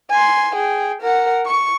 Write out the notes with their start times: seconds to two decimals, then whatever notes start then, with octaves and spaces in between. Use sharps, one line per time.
0.11 G#5 C6
0.56 G#4 G5
1.02 A#4 F#5
1.46 C#6